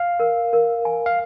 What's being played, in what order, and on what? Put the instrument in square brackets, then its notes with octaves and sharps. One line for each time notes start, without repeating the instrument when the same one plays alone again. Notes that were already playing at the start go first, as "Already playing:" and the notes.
Already playing: [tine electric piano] F5
[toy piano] A#4
A#4
G#5
[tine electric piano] F5